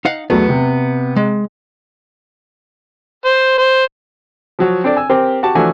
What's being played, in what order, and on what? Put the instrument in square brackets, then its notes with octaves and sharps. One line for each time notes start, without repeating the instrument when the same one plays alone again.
[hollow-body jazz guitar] D#4 F5 F#5
[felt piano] E2 F#3 A3 [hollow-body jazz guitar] B3
[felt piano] C3
[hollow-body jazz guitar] G#3
[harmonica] C5
C5
[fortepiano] F3 F#3 F#4
C4 D4 A4 D5
G#5 E6
C4 G4 A#4 C5
F#4 G4 A5
E3 F3 A3 D4 F#4 G#5